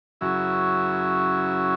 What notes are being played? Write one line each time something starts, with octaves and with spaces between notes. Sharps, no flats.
F#2 C#3 F#3 E4